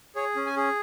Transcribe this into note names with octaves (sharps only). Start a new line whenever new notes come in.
G#4 C#5
C#4
G#5
G#4